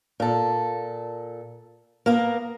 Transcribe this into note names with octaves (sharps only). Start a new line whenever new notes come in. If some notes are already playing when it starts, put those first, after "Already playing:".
A#2 A4
A#3 B3 A#4